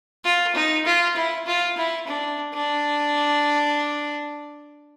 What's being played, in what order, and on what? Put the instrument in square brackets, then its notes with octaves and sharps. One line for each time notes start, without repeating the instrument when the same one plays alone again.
[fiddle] F4
D#4
F4
E4
F4
E4
D4
D4